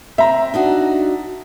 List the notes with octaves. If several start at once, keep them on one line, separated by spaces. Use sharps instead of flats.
C4 E5 A#5
D4 D#4 F#4